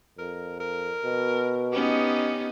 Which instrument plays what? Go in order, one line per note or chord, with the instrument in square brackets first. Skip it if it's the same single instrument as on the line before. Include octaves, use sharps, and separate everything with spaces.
[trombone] F2 [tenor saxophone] A#4
[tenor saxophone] A#4
[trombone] B2
[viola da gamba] B3 C#4 D#4 [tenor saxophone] G4